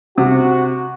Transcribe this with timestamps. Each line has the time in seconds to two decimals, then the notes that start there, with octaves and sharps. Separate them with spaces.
0.18 C3 F#4